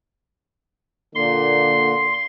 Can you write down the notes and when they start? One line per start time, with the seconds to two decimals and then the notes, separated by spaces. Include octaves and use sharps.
1.15 A#2 D3 A#3 C6